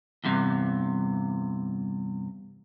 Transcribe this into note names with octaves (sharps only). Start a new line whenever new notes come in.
E2 G2 C3